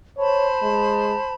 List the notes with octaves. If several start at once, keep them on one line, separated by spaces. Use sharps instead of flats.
C5 C#5 A5 B5
G#3